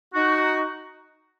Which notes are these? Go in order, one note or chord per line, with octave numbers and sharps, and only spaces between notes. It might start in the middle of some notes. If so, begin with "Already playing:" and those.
D#4 F#4